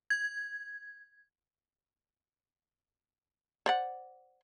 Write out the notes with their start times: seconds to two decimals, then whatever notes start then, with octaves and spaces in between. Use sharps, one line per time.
0.10 G#6
3.66 C5 D5 F#5